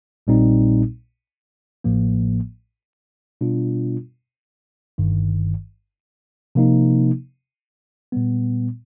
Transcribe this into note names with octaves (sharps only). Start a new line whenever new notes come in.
A#1 A#2 G3 C4 D#4
A1 A2 F3 A#3
B2 G3 B3 D4 F4
G1 G2 D#3
C3 F3 A#3 D#4
A#2 G3 B3